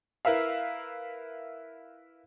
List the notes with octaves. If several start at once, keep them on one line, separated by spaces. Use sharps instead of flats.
E4 A#4 B4 E5 F5